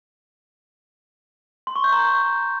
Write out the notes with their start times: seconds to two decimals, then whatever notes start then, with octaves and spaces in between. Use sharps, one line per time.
1.67 C6
1.76 C#6
1.84 G6
1.93 A#5
2.01 C#6